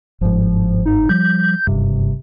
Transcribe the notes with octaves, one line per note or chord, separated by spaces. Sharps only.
G1 G#2 F3
D#4
F3 G3 G6
F#1 G2 C3